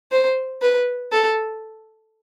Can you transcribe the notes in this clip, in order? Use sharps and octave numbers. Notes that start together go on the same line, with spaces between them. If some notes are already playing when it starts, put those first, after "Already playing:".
C5
B4
A4